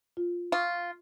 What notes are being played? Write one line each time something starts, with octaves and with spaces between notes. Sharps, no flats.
F4
F4 C#6 D#6